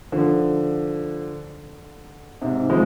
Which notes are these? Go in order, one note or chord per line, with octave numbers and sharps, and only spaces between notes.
D3 F3
G#2 C3
F3 G#3